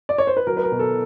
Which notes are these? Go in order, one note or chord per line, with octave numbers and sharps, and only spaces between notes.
D5
C#5
C5
B4
F#3 A#4
B4
A#4
B2
A4